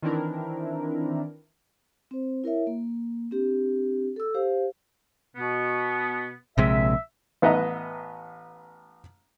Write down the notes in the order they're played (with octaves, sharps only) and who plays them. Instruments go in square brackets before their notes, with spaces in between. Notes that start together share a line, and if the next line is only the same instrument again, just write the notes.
[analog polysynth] D#3 E3 C4 D4 E4 A#4
[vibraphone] C4 C5
E4 A#4 C#5 E5
A#3
C4 D4 G4
A4 E6
G4 C5 F5
[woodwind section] B2 B3
[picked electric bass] A#1 C3 G#3 [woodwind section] E5
[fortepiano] A1 B3 B4 D#5 E5 A#5